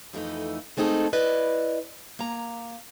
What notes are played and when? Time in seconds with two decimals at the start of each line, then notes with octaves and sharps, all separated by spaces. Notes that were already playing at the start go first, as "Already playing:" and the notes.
0.13 F2 E3 A3 D#4
0.77 G#3 A3 C4 D#4 G#4 A4
1.13 E4 B4 D5 D#5
2.19 A#3 A#5